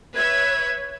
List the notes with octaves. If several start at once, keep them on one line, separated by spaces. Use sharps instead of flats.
B4 C#5 E5 G#6